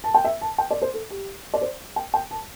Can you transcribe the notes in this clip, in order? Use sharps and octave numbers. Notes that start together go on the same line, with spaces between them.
A5
G5
E5
A5
G5
D5
C5
A4
G4
D5
C5
G5
G5
A5